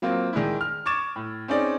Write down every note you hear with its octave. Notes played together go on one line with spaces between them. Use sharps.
F#3 A#3 C4 F4
D#3 G#3 D4 E4
F6
C#6 D6 G#6 A6 E7
A2
C4 C#4 D#4 G#4 D5